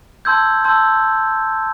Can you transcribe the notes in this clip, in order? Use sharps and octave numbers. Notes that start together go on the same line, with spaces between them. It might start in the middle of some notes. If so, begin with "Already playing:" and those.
A5 C6 E6 G6 G#6
A5 C6 E6 G6